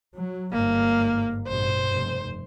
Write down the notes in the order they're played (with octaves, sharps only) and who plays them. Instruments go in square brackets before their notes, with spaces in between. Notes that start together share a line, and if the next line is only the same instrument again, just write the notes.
[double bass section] F#3
[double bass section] G1 G#2 [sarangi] A#3
[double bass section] A1 G2 B2 [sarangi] C5
[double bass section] F1